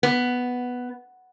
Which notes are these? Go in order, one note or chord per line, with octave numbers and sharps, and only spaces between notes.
B3